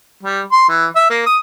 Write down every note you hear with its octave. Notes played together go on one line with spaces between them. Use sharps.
G3
C6
E3
E5
A#3
D#6